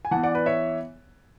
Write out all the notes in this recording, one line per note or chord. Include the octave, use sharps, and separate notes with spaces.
G#5
E3 B3 F#5 A5
D5 F#5
B4 D5
C#5 E5